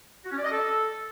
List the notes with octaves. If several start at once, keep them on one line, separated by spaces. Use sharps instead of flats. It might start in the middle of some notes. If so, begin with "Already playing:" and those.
F#4
C#4
D5
D#5
A4